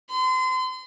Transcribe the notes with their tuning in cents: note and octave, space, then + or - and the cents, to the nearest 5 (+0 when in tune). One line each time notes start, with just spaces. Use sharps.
C6 -35